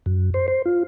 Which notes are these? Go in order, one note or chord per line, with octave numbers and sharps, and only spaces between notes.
F#2
C5
C5
F4